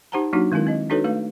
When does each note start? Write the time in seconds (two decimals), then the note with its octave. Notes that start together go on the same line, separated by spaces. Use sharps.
0.12 D#4 G4 C5 F#5 A5 A#5
0.33 F#3 A#3 D4 D#4 F#4
0.52 D#3 G#3 C4 E4 A#4
0.67 C4 D#5
0.90 D4 D#4 F#4 A4 B4 C#5
1.04 A3 B4 F5